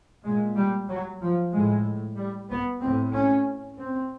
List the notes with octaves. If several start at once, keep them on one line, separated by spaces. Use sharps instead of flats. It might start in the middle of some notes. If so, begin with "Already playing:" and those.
A#2 G#3
G3
F#3
F3
A2 G#3
G3
B3
A2 C4
C#4
C4